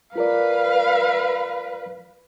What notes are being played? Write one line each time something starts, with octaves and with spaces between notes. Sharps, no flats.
F4 A#4 B4 D5 F5